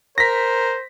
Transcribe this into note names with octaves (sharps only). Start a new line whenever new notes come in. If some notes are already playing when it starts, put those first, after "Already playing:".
A#4 C5 A#6 B6